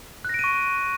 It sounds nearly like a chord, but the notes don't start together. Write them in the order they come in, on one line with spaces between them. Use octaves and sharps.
F#6 A#6 D7 D#7 C#6